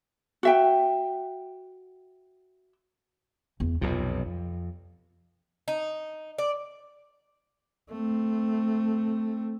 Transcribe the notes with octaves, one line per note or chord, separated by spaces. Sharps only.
F#4 E5 G5
E2
B1 F2 C3 F4
F2
D#4
D5
A3 C4